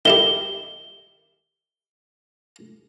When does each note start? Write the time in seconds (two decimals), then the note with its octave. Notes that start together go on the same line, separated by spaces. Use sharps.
0.05 D#3 E4 G4 G7